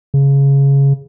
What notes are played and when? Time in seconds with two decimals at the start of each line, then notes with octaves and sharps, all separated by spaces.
0.14 C#3